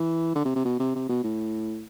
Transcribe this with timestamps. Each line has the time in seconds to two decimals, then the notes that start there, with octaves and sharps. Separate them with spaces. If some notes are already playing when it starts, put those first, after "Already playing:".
Already playing: E3
0.35 D3
0.45 C3
0.55 C3
0.65 B2
0.79 C3
0.95 C3
1.09 B2
1.24 A2